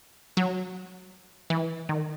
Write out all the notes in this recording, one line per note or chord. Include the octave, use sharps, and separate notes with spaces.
F#3
E3
D#3